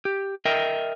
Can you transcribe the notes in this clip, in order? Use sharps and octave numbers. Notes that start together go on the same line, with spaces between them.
G4
A#4 D#5 E5 G5